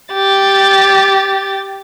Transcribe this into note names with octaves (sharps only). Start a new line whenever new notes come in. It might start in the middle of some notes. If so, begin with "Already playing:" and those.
G4 A6